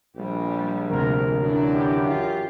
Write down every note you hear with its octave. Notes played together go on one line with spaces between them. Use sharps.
A#1 G3
D2 C3 A#4
F#2 E3 D4
G4
F4